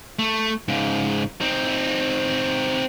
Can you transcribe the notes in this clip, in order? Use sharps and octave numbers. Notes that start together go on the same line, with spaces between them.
A3
G#2 C#3
C4 D#4